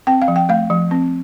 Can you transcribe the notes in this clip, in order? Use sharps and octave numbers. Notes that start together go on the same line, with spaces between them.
C4 G5
F5
F3
G5
A3 F5
F3
C4